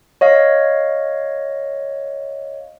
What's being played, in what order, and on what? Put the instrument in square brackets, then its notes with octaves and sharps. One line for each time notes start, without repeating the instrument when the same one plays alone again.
[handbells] C#5 D#5 F5